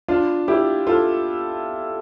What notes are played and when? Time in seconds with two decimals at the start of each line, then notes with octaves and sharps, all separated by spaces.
0.08 D4 F4
0.48 E4 G4
0.87 F4 A4